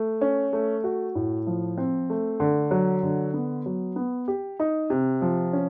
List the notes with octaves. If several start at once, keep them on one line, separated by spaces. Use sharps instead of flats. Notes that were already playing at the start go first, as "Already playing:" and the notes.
Already playing: A3
C#4
A3
F#4
A2
F3
C4
A3
D3
F#3
D3
B3
F#3
B3
G4
D#4
C3
F3
C#4